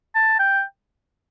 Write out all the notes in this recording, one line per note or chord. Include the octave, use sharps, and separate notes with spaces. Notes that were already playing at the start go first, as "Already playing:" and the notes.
A5
G5